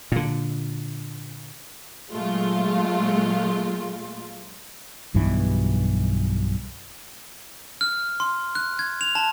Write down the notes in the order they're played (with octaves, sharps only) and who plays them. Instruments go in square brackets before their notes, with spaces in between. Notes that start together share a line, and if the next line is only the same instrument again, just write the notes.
[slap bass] A#2 D3
[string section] A#2 F#3 G#3 A3 F4
[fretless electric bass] B1 G2 B2 E3
[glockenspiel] F6
C6
F#6
G#6
F7
A5